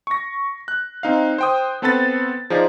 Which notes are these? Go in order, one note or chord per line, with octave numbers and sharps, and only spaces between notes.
C#6 A#6
F#6
C4 D#4 F5
C5 G5 D#6
B3 C4 A4 B4 B5 A6
F3 D#4 G#4 C5 D5 F5